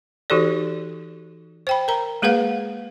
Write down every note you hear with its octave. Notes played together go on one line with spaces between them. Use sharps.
E3 D#4 F#4 G4 A4 D5
C5 G5 B5
A#4 A#5
G#3 A#3 G#4 B4 F5 F#5